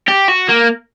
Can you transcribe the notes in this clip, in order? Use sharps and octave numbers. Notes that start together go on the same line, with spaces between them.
G4
F#4
A#3